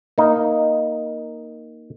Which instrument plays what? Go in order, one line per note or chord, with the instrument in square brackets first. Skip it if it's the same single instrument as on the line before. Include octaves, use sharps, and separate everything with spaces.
[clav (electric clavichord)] A#3 D#4